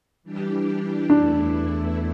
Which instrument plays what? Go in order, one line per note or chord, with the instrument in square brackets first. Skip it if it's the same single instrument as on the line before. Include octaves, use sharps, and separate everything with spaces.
[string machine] E3 G3 D4 G4
[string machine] E2 E3 A3 E4 [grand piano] D4